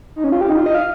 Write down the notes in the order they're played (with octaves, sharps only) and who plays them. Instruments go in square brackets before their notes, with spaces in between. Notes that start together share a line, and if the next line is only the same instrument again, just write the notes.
[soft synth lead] D#4
C#4
F4
G4
D#4
F4
D#5
F5